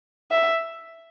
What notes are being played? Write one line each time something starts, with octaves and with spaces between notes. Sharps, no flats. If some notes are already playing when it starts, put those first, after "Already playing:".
E5